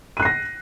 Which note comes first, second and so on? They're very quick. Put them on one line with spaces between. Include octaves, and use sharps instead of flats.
D#7 F#6 C7 A#6